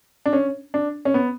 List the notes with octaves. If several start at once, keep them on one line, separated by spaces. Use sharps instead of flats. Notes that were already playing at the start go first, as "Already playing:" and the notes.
D4
C#4
D4
C#4
B3